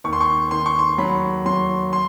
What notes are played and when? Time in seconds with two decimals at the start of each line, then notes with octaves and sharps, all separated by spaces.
0.04 D#2 C#6
0.13 C6
0.20 C#6
0.51 D#3 C6
0.66 C#6
0.79 C6
0.98 F#3 B5
1.46 F#3 C6
1.93 C6